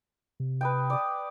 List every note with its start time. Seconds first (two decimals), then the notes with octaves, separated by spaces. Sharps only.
0.40 C3
0.61 B4 D#5 G5
0.90 D5 D#6